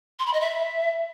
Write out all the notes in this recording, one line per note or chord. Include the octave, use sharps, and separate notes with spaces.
C6
B5
D#5
E5